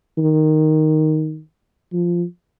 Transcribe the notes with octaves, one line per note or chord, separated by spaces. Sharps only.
D#3
F3